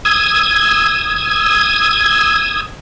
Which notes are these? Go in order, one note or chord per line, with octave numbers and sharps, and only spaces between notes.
D#6 E6 G#6